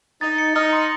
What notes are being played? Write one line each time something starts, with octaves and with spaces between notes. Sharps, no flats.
D#4 A6
C#7
D#4 F6
C6